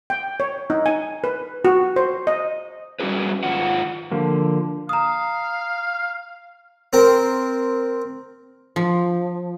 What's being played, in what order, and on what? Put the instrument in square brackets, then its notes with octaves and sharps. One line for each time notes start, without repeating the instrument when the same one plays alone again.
[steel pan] G5
C#5
D#4
G#5
B4
F#4
C5
D#5
[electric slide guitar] G3 C#4 F#4 G#4 B4
G#2 D#3 F4 F#5
[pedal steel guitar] D3 F3 A#3
[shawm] F5 [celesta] A#5 D#6
[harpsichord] C4 A#4
[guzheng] F3